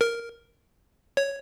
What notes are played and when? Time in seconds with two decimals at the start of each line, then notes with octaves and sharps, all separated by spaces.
0.01 A#4
1.17 C#5